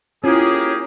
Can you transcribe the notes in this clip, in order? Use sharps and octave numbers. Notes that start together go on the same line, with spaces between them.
A#3 C#4 E4 F4 G4 G#4